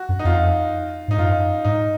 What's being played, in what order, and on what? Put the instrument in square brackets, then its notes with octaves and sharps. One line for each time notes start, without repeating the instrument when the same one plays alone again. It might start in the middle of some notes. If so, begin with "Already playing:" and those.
Already playing: [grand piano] F#4
[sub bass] F#2
[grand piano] D#4
[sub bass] F2 [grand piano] F4
[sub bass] G#2 [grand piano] D#4
[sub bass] F#2 [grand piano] F4
[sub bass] G#2 [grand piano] D#4